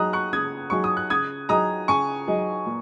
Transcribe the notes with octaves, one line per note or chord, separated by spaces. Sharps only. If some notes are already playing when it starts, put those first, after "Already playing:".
Already playing: F#3 D#4 G#4 D#5 A#5 D#6 F#6
C#6 F#6
C#3 D#6 G#6
F#3 D#4 G#4 D#5 C#6
D#6
F#6
C#3 D#6 G#6
F#3 D#4 G#4 D#5 A#5 D#6
C#3 G#5 C#6
F#3 D#4 G#4 D#5
A#2